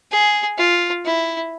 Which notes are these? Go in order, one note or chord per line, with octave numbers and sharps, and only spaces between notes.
G#4
F4
E4